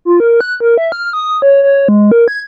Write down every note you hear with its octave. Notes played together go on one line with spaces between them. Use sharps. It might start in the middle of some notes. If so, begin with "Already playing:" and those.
F4
A#4
F#6
A#4
E5
F6
D#6
C#5
C#5
G#3
A#4
G#6